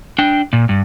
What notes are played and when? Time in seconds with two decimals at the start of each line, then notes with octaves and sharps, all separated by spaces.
0.18 D4 G5
0.53 A#2
0.69 G2